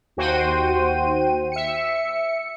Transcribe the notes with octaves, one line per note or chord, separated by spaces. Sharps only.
D#2 F#4 C5 G5 D#7
E5 C#7